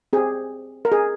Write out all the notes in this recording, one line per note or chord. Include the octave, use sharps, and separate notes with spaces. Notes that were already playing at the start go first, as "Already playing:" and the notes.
C4 G4 G#4
A#4
G#4